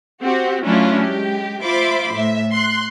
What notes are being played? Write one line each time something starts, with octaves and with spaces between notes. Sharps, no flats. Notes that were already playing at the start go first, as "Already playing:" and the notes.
C4 F#4 G4
F#3 A3 C#4 D4 E4 F4
G#3 G4
F4 C5 E5 B5 C6 D6
A2 E5
C6 F#6